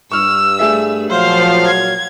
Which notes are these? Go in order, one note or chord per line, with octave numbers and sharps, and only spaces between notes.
G2 C#6 E6 F6
A3 G#4 E5
A#2 F3 F#3 C5 F5
G#6